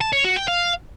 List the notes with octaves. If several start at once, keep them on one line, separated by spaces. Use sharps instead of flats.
A5
C#5
F#4
G5
F5